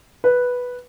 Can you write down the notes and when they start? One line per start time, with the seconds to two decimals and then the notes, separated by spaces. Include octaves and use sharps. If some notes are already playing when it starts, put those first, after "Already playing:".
0.24 B4